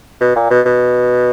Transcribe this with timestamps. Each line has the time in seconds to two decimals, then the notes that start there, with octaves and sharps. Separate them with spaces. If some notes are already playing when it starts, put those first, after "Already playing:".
0.21 B2
0.36 A#2
0.51 B2
0.66 B2